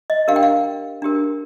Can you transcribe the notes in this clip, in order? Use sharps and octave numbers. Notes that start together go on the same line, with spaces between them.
D#5
D4 G4 A#4 F5
G5
F5
D4 G4 A#4